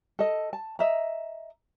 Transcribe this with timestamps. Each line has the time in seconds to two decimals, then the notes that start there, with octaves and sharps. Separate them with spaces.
0.19 A4 D#5
0.53 A5
0.79 D#5 E5 A#5